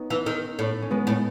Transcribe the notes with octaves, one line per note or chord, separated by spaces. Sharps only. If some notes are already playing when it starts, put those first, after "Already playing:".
Already playing: B3 C#4 D#4
E3
D#3
A2
C#4
G#3 B3
A2